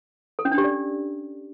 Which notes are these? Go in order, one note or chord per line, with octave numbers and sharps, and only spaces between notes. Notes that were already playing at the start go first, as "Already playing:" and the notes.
A4
C#4
D4
G4
D5